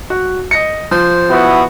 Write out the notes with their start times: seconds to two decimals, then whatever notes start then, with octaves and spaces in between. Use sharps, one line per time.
0.10 F#4
0.51 D#5 A#6 C#7
0.91 F3 C5
1.30 B3 E4 F#4